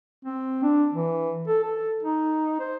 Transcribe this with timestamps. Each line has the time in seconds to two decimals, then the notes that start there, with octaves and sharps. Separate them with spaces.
0.25 C4
0.63 D4
0.93 E3
1.48 A4
1.64 A4
2.03 D#4
2.60 C5